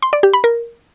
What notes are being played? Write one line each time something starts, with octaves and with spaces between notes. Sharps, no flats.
C6
D5
G4
B5
A#4